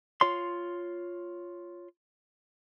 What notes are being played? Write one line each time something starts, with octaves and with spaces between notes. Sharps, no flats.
F4 C#5 C6